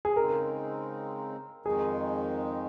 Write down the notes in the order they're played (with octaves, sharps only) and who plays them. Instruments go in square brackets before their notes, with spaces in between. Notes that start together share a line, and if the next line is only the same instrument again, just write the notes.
[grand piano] G#4
[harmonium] C#3 G#3 C4 D#4 [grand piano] A#4
[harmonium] F2 D#3 G#3 D#4 [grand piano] G#4